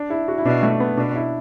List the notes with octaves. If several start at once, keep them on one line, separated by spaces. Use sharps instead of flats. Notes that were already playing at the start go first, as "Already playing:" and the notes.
Already playing: D4
E4
F#4
E4
B2 D4
A3
B3
B2 D4
E4